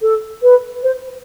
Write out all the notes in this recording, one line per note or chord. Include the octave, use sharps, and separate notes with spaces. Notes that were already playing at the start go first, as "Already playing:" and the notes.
A4
B4
C5